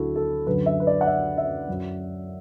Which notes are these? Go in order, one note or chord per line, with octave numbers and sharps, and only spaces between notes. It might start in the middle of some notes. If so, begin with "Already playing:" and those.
Already playing: D2 D3 F#3 E4 F#4 A4
A4
F#2 D3 F#3 B4
E5
B4
D5
F#5
E5
E5
F#2 F#3